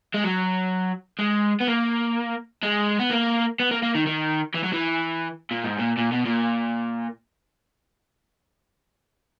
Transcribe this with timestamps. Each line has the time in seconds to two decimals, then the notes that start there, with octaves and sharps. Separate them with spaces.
0.15 G#3
0.25 F#3
1.19 G#3
1.61 B3
1.68 A#3
2.63 G#3
3.00 B3
3.11 A#3
3.60 B3
3.71 A#3
3.83 A#3
3.95 D#3
4.07 D#3
4.55 E3
4.64 F#3
4.73 E3
5.51 A#2
5.64 G#2
5.79 A#2
5.98 A#2
6.12 B2
6.26 A#2